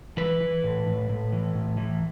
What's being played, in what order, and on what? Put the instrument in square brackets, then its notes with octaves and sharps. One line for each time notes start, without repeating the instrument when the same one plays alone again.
[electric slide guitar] E3 B4
E3
A2
A2
A2
E3
A2
E3